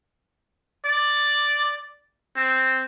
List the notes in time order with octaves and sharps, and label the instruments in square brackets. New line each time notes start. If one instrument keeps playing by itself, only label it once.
[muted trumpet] D5
C4